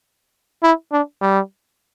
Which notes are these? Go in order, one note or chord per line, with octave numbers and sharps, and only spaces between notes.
E4
D4
G3